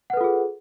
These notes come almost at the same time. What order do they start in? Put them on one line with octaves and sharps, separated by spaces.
F#5 B4 A4 F4 G#4